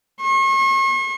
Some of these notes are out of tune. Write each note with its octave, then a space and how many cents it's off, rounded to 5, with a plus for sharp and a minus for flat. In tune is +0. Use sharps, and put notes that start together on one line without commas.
C#6 -40